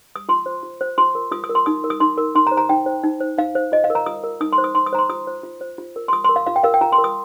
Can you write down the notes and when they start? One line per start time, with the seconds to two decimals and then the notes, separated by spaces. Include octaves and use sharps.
0.16 D#6
0.29 F4 C6
0.46 C5
0.63 F4
0.81 C5
0.98 F4 C6
1.15 A#4
1.32 F4 D#6
1.44 D#6
1.49 A#4
1.55 C6
1.66 D#4 D#6
1.84 A#4
1.90 D#6
2.00 D#4 C6
2.18 A#4
2.35 D#4 C6
2.47 A#5
2.52 C5
2.57 A#5
2.69 D#4 G5
2.86 C5
3.04 D#4
3.20 C5
3.38 D#4 F5
3.55 C5
3.72 F4 D#5
3.84 F5
3.90 A#4
3.95 A#5
4.06 F4 D#6
4.24 A#4
4.41 D#4 D#6
4.53 C6
4.58 C5
4.64 D#6
4.75 D#4 C6
4.86 D#6
4.92 C5 A#5
4.98 C6
5.09 F4 D#6
5.27 C5
5.43 F4
5.61 C5
5.78 F4
5.96 A#4
6.08 C6
6.13 F4 D#6
6.24 A#4 C6
6.36 F5
6.46 F4 F5
6.56 G5
6.64 A#4 F5
6.74 G5
6.81 F4 A#5
6.92 C6
6.98 A#4
7.04 D#6